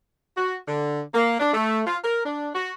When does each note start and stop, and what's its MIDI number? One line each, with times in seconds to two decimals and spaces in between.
0.37 0.56 66
0.68 1.01 50
1.14 1.38 58
1.40 1.52 62
1.53 1.81 57
1.86 1.97 65
2.04 2.25 70
2.25 2.49 62
2.55 2.72 66